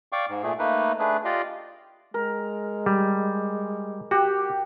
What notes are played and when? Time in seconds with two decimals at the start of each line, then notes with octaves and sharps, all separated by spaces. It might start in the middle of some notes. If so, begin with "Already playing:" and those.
0.12 D5 F5 G5 C#6 D6
0.29 G#2
0.43 A#2 A3 G#4
0.59 A3 A#3 D#4 B4
0.99 A3 D4 G#4 B4
1.25 F4 G4 D5 D#5 F5
2.14 G#3 A#4
2.86 G3
4.11 F#4 G4